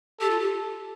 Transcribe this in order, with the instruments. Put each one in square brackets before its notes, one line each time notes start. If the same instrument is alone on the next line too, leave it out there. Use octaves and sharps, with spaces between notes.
[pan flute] G4 [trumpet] A4
[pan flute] F4
G4